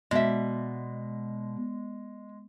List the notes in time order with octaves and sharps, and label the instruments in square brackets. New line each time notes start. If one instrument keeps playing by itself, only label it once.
[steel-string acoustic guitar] B2 [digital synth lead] G#3 [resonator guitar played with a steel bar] D5 E5